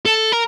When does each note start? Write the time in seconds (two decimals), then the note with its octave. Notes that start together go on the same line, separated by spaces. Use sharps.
0.06 A4
0.33 A#4